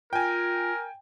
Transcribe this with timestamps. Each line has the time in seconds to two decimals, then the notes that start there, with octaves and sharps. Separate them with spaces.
0.13 F4 A#4 G5 G#5